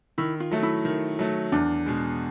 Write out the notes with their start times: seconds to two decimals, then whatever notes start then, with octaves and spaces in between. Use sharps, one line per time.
0.18 D#3 E4
0.40 F4
0.51 F#3 A3
0.63 E4
0.85 D#3
1.19 F#3 A3
1.52 E2 D4
1.86 B2 G#3